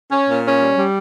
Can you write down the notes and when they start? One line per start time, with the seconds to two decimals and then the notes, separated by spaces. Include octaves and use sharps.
0.10 C#4
0.27 A#2
0.43 C#4
0.60 G3
0.77 G3